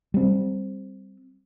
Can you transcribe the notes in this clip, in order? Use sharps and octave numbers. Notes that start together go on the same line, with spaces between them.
G3 C4